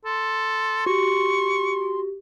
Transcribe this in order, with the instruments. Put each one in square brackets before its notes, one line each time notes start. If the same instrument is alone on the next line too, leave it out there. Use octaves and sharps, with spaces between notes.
[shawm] A4 [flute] C6
[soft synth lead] F#4 [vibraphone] G4 [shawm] C#6